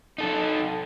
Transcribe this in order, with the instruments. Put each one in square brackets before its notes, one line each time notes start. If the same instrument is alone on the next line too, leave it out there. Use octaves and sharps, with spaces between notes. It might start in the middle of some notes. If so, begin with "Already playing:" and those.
[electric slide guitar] D#4 A4